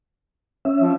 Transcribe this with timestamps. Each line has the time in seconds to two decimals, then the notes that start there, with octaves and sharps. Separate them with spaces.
0.65 C#4 E5
0.80 F3